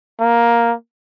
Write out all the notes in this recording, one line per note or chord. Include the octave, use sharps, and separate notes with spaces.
A#3